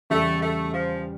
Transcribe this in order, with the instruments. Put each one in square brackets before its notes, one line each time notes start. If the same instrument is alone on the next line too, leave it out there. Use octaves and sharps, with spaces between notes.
[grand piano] E2 C#3 G3 [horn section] A3
[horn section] A3
F3